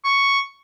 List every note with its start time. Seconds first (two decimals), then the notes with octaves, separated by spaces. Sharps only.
0.04 C#6